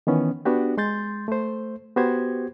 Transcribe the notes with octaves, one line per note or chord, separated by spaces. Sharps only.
D#3 E3 B3 C#4
B3 D4 F#4 G4
G#3 C6 G6 A6
A3 C5
B3 F#4 G4 C5 G#6